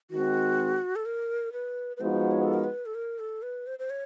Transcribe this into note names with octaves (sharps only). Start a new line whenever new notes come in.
D#3 G#3 C4 F#4
A4
A#4
B4
B4
F3 G#3 B3 D#4 F#4 C5
C#5
A4
A#4
B4
A4
A#4
A4
B4
C5
C5
C#5